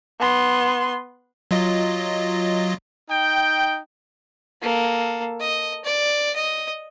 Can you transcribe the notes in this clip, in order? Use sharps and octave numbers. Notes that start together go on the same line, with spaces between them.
B3 C6
F#3 F4 D#5
D#4 G5
A#3 A4
D#5
D5
D#5